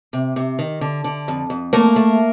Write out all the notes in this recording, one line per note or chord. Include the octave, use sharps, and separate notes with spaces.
C3
C3
D#3
D3
D3
F2
F2
A3 A#3 A#4
A3